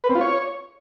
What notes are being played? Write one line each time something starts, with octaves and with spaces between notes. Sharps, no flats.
B4
C4
F4
C#5